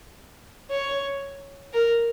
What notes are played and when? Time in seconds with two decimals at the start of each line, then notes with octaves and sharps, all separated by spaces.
0.70 C#5
1.73 A#4